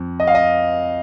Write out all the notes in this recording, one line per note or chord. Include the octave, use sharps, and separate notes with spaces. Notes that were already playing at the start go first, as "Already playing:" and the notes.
Already playing: F2
D#5
F5
D#5